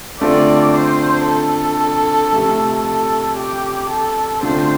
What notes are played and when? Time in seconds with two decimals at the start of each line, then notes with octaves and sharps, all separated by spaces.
0.21 D3 A3 C4 F4 D5
0.75 C5
1.27 A4
2.32 C3 F3 A3
2.86 A4
3.38 G4
3.90 A4
4.43 D3 A3 C4 F4 C5